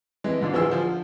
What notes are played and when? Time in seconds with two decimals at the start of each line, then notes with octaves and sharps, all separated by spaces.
0.24 F2 E3 G#3
0.41 G#2 D3 D4 F4
0.52 D1 E3 F3 G#4 E6
0.70 D3 F3 F4